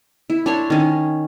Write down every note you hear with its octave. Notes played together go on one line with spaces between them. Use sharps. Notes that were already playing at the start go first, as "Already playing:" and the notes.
E4
D4 C#5 C6
D#3 C#4